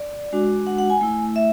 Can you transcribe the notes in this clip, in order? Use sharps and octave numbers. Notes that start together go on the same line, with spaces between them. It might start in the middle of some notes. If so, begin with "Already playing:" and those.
Already playing: D5
G#3 D4 F#4
F#5
F#5
G#5
A3 E4
E5